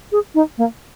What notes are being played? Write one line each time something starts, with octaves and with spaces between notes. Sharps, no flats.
G#4
D#4
A#3